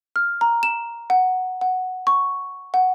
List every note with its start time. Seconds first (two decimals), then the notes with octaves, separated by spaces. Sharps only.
0.16 F6
0.41 A#5
0.63 E7
1.10 F#5
1.61 F#5
2.07 C#6
2.74 F#5